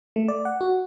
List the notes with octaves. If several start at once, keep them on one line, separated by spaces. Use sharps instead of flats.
A3
D5
F#5
F#4